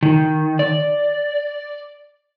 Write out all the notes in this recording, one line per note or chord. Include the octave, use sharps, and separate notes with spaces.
D#3
D5